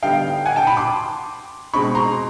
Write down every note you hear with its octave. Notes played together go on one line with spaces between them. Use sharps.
D3 G3 B3 D#4 F5 G5
F#5 G#5
G5 A5
A5 B5
C6 D6
B2 G#3 C4 D#4 B5 C#6
A#5 C6